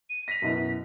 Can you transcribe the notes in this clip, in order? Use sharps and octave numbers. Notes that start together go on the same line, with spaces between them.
D#7
A#6 B6 F7
F#2 B2 E4